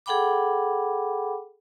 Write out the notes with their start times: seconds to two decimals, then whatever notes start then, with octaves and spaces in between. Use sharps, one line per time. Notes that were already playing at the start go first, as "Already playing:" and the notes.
0.06 G#4 A4 F#5 G5 B5 D6